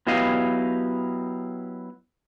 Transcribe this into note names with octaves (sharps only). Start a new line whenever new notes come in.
F#3 B3 E4 G4 D#5 F5